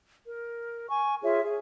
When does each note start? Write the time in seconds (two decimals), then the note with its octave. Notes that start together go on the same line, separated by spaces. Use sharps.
0.25 A#4
0.88 G#5 C#6
1.23 F4 G#4 C#5 E5
1.43 G#4